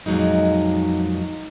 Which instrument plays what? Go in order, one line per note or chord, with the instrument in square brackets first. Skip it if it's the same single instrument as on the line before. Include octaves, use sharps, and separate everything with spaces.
[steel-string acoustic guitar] F2 A#2 F#3 G#3 D#4